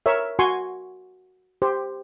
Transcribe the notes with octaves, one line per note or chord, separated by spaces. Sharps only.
A#4 C#5 E5
F#4 G#5 C6 C#6
G4 C5